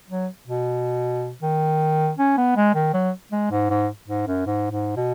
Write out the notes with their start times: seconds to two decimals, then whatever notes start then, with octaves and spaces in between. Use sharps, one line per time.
0.10 F#3
0.47 B2
1.42 D#3
2.18 C#4
2.37 B3
2.56 G#3
2.75 D#3
2.93 F#3
3.32 G#3
3.51 G#2
3.70 G#2
4.08 G#2
4.27 F#2
4.46 G#2
4.71 G#2
4.96 B2